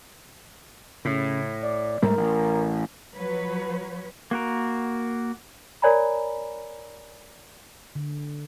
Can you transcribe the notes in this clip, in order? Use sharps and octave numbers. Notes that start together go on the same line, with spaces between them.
A2 C#3
D5
G#2 G3 A3 A#4
A1
F3 F#3 B4 C#5
A#3 F#4 A#4
A#4 C#5 D5 G#5 A#5 B5
D3